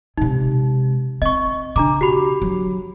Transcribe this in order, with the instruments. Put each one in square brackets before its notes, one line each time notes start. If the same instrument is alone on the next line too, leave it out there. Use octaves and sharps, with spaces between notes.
[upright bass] C3 G#3 [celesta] D#4
[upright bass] C4 [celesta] D#5 C#6
[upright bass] C#3 [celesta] D4 A#5 D6
[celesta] F#4 G4 B5
[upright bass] F#3